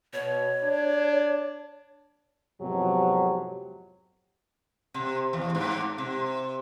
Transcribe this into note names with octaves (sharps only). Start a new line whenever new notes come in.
B2 C#5
D4
F2 G#2 C3 F#3 B3 G4
C3
E2
G#2
C3